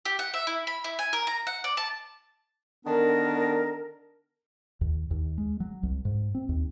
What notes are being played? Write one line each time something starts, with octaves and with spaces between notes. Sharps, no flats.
G4
F#5
E5
E4
B5
E4
G#5
A#4
A#5
F#5
D5
A5
D3 D#3 B3 D4 A#4
D#2
D#2
G#3
F#3
C2
G#2
C4
D#2